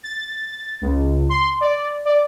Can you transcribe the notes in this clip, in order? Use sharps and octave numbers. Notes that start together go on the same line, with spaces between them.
A6
C#2
C6
D5
D5